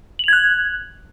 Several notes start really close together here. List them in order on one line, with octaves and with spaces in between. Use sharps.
F#7 F7 G#6 F#6